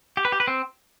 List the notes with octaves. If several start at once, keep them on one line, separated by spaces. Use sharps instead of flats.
G4
B4
G4
B4
C4